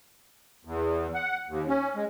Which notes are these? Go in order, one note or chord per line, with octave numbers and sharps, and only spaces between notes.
E2
F#5
D#2
C#4
G#3